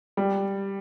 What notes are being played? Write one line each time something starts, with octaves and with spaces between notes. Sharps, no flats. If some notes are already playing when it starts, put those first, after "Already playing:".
G3